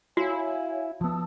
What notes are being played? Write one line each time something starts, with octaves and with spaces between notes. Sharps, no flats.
E4 F#4 C#5 F5 G#5
F3 B3 A5 D#6 E6